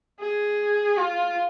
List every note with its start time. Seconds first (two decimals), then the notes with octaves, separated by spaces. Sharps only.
0.20 G#4
0.97 F4